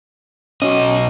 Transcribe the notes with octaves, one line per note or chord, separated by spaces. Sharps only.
B1 C#4 F#4 D#5